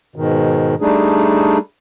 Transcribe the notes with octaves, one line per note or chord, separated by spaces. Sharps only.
G#2 B2 D#3
G3 A3 D4 D#4 G#4